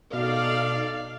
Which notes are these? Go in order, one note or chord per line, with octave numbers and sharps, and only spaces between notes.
B2 D#4 A4 D5 F5